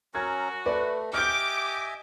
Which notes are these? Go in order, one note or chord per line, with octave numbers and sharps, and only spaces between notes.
F#3 C#4 F#4 A#4 G#6
A3 B4 D5
G4 D#5 E5 G#5 D6 F6 G6